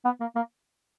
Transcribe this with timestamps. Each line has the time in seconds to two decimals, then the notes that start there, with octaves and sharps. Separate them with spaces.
0.05 B3
0.20 A#3
0.36 A#3